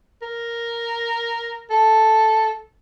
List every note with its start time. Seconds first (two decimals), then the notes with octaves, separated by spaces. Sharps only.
0.22 A#4
1.70 A4